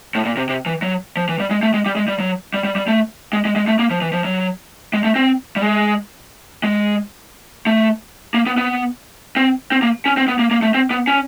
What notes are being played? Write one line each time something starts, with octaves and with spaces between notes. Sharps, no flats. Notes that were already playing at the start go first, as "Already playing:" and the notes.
A2
A#2
C3
C3
E3
F#3
F3
E3
G3
G#3
A3
G#3
G3
G#3
G3
F#3
G3
G3
G3
A3
G#3
G#3
G#3
A3
A#3
F3
E3
F3
F#3
G#3
A3
C4
G3
G#3
G#3
A3
A#3
B3
B3
C4
C4
A#3
C#4
C4
B3
A#3
A#3
A3
C4
B3
C#4